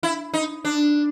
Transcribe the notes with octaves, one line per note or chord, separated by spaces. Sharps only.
E4
D#4
D4